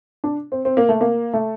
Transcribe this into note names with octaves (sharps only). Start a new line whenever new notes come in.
D4
C4
C4
A#3
A3
A#3
A3